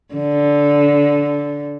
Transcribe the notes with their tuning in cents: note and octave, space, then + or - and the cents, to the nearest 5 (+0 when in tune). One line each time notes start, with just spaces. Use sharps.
D3 -15